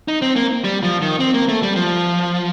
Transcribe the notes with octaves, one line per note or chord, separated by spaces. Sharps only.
D#4
C4
A#3
G3
F3
D#3
C4
A#3
A3
G3
F3